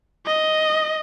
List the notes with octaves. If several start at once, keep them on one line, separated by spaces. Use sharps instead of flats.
D#5